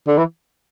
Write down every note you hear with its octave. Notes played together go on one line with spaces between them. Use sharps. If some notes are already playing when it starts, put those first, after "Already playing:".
D3
E3